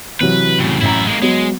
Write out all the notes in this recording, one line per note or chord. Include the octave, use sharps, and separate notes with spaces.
C3 E3 F#3 B4
A2 C#3
A1 F#2 E4 A#5
G#3 A#3
F#3 G#3 B3